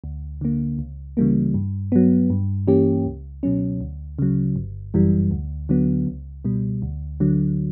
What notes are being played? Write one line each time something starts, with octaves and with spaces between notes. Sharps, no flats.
D2
D3 A#3
C#2
C#3 E3 G3 A#3
G2
F#3 B3
G2
E3 A#3 C#4 G4
C#2
B2 F#3 C#4
D2
C#3 F#3
G1
F#2 E3 G3
D2
D3 F#3 B3
C#2
B2 G3
D2
D3 F#3